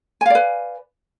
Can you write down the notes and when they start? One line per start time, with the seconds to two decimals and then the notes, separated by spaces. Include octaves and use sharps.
0.21 G#5
0.26 F5
0.30 D5
0.35 B4